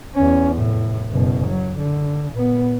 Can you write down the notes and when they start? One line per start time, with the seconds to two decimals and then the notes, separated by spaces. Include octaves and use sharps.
0.15 E2 C#4
0.56 F1 A2
1.12 F#1 B2
1.47 F#3
1.79 D3
2.32 A#2 B3